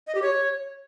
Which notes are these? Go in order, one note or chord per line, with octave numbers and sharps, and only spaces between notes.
D#5
G4
C#5